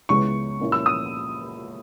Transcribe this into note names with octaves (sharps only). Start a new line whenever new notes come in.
C#2 C#3 G#3 B3 E4 C#6
A#2 A#3 C#4 E4
E6
D#6